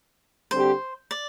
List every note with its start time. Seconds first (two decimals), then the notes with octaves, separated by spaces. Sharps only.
0.51 D3 G3 C4 G4 C5
1.11 D5